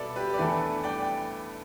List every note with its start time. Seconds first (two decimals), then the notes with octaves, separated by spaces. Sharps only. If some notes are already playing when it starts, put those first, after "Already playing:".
Already playing: B2 A4 B4 D5 E5
0.16 G4 B4
0.34 D5
0.38 E2 E3 A3 D4 A4 B4 E5
0.84 D5 G5